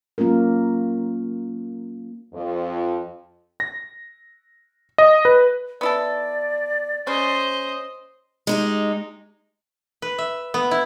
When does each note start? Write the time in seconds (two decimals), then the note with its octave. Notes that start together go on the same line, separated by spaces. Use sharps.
0.18 F#3 A#3 C#4 F4 A#4
2.34 F2
3.60 A#6
4.98 D#5
5.25 B4
5.81 B3 E4 A4 D5
7.07 C#3 C#4 C5 D#5
8.47 G#3 D#4 G4
10.02 B4
10.18 E5
10.54 B3
10.71 E4